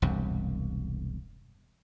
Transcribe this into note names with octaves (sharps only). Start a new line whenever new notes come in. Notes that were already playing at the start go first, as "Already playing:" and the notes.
E1 C2 G2